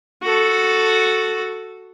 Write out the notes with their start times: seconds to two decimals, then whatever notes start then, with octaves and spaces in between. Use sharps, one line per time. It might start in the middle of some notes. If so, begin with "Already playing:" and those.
0.23 F#4 A4